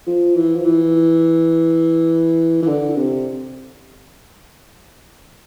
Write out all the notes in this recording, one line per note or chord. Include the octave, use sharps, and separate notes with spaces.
F3
E3
F3
E3
E3
D3
C3